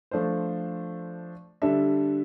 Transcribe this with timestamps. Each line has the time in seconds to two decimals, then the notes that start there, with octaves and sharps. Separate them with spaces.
0.11 F3 A3 D4 A4 C5
1.62 D3 G3 D4 A4 E5